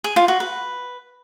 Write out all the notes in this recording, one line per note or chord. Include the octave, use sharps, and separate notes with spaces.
G#4
F4
F#4
B4